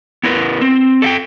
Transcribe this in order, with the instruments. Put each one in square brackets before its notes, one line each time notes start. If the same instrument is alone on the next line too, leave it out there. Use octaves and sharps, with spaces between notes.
[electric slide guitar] B3 E4 A#4 B4
C4
A4 F5 G5